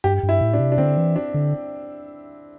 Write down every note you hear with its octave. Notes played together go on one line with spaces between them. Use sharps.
G2 G4
G2
E4
A2
D4
C3
D4
D3 C4
E3
D4
D3